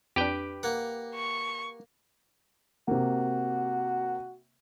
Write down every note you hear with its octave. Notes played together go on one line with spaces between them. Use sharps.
F2 D4 G4 B4 G5
A#3 F#5
C#6
C3 A#3 F#4